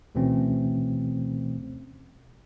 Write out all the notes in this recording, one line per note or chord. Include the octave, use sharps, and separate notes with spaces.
D2 B2 E3 A3 C4 C#4